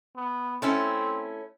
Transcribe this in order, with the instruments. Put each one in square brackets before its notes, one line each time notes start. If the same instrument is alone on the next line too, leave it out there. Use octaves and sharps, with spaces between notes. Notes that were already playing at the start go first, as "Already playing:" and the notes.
[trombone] B3
[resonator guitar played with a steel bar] A3 C#4 E4 [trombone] C4